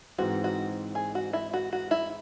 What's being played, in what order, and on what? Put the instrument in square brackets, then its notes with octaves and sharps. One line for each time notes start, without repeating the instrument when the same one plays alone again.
[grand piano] G#2 E3 G#3 C4 D#4 [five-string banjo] F#4
[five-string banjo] F#4
G#4
F#4
E4
F#4
F#4
E4